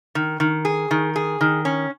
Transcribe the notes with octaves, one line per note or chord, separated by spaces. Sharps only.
D#3
D#3
G#4
D#3
G#4
D#3
C#4